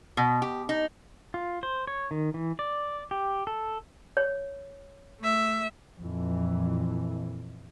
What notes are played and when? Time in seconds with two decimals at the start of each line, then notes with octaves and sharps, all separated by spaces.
0.17 B2
0.42 G4
0.69 D#4
1.34 F4
1.63 C5
1.87 C#5
2.11 D#3
2.34 E3
2.59 D5
3.11 G4
3.47 A4
4.17 C#5
5.20 A3 E5
5.99 F2 A#2 E3